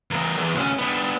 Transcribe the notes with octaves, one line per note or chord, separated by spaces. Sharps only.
E2 A#4
E2
D2 C#4
B3 D4